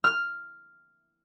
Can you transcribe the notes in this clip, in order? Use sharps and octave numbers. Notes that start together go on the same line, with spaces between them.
F6